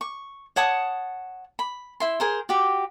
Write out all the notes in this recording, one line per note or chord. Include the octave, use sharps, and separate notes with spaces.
C#6
C#5 F#5 A5 D#6
B5
E4 E5 C6
G#4 A#4 C5
F#4 G4